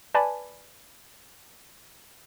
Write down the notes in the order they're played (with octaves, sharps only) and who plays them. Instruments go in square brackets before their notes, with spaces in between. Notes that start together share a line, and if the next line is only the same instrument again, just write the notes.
[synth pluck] B4 D5 G#5 A5 B5